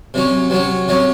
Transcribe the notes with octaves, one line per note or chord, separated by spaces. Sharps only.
C3 F#3 C#4
C3 F#3 C#4
C3 F#3 C#4